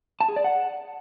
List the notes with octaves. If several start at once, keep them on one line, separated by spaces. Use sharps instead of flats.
A5
G#4
D5
F#5